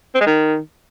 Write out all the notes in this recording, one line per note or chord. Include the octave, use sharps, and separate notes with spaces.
C4
G#3
D#3